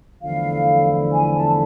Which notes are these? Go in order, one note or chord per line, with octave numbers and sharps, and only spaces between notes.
E2 D3 F3 A3 E4 F5
G#5
A5